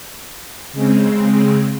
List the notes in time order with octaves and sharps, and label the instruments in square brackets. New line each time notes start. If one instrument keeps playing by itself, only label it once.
[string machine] C#3 G#3 C4